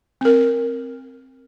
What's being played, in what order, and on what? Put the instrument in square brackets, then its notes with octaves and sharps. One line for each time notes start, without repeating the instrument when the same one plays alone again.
[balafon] C4 A#4